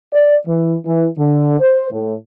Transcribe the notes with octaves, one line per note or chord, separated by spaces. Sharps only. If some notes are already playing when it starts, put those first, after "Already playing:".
D5
E3
E3
D3
C5
A2